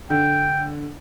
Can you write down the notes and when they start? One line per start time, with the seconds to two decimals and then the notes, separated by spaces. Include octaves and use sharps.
0.10 D3 G5